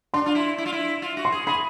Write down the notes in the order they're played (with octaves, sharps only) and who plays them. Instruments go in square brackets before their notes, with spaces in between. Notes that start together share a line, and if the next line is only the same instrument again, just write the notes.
[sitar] D4 [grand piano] C6
[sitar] F4
E4
E4
F4
E4
F4
F#4
[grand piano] C6
[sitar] G#4
[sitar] G#4 [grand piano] B5